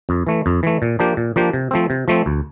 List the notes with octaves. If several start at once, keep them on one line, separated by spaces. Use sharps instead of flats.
F2
E3 A3
F2
E3 A3
A#2
F3 A#3 D4 G4
A#2
F3 A#3 D4 G4
C3
F3 A3 C4
C3
F3 A3 C4
D2